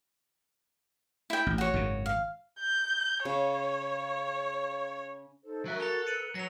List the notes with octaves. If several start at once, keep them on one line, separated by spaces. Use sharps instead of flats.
E4 G5
A1
F#4 C#5
G#1 F#2 C#3
F5
G6
C#3 C#5
D#4 A4 C5
F#3 F#4 A#4 E5 F#6
A4 A#5 F7 G7
B4 C#7 D#7 F#7
F#3 C#5 A#6 F7